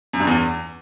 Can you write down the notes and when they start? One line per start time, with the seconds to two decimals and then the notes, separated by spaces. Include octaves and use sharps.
0.13 F#2
0.20 G2
0.27 E2